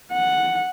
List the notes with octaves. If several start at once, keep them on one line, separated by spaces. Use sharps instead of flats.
F#5